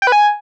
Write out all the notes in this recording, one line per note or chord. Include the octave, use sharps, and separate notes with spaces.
G5
B4
G#5